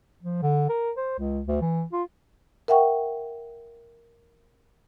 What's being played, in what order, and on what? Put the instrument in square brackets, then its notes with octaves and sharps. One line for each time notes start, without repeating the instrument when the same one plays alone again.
[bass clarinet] F3
D3
A#4
C5
C#2
D2
E3
F4
[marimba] A#4 E5 F#5 G5 C#6